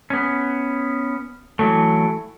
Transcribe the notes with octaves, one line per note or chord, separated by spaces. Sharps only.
B3 C#4
E3 F#3 A3